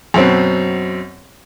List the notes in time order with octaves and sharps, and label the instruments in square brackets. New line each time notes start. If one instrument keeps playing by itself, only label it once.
[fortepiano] F#2 B2 C4